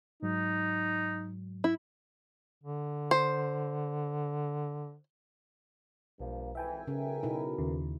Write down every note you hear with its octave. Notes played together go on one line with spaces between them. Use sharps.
G#2 F#3 D#4
E4
D3
C5
B1 G2 F3 A#3
G#1 F2 E3 E5 G5 G#5
B1 C#3 A#4
B2 D#4 E4
D#2 C#3